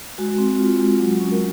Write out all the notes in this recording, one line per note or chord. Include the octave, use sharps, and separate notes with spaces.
G#3 F#4
C4
F4
G#3
F#3
C#4
A#4